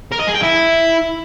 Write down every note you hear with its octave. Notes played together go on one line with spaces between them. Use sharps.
A#4
D#5
G#4
G5
E4